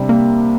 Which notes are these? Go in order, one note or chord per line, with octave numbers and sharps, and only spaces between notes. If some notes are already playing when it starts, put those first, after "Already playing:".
Already playing: C3 G3 D4 G4
A#3